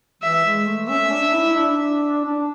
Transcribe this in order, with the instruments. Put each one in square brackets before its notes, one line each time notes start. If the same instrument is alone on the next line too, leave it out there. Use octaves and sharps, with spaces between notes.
[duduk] E3 [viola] E5
[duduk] G#3
A3
[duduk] C#4 [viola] E5
[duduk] D4
E4
D4
D4